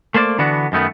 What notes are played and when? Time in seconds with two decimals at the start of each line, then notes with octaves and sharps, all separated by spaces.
0.14 A3 A#3 C5 D5
0.38 D3 E3 B3 D4 F#4
0.72 F#2 D#3 A3 B3